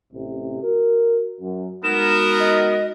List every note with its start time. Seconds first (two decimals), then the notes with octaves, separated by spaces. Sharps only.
0.13 A1 C3
0.63 F#4 A#4
1.41 F#2
1.84 G#3 B3 D#4 F#4 A#4 E7
2.40 D#5